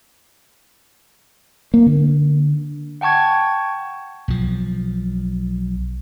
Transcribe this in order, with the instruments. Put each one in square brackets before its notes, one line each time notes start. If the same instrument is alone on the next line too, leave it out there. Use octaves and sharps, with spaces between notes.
[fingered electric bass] A#3
D3
[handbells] F#5 G5 A5 C#6 G#6
[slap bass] B1 F3